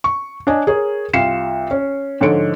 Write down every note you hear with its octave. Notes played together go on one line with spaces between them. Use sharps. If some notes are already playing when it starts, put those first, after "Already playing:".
C#6
D4 C#5 D#5 G#5
G#4 A#4 C#5
C2 F4 F5 C7 C#7 E7
C#4
G#2 D3 F3 C#5 C#7 D7